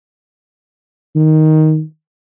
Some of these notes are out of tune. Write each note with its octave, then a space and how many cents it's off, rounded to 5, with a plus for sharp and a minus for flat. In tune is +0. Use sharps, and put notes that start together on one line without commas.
D#3 +5